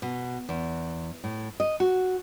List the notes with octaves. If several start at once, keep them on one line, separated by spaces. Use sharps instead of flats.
B2
E2
A2
D#5
F#4